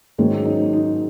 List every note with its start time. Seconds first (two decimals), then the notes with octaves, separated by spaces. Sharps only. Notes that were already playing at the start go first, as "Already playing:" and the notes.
0.18 G#2 D#3 F#3 C#4
0.45 D#4
0.73 D#4